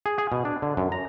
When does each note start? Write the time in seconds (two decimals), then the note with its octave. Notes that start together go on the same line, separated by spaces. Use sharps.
0.06 G#4
0.18 G#4
0.32 B2
0.45 D4
0.62 D3
0.77 F#2
0.92 A#5